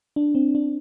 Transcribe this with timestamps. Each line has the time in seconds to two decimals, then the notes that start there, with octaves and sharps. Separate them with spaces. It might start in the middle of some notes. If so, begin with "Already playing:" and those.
0.16 D4
0.35 C4
0.55 D4